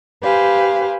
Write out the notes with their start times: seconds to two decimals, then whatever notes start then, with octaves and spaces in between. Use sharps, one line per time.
0.22 G4 B4 C5 F5 G#5